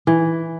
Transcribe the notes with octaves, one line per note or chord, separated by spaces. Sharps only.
E3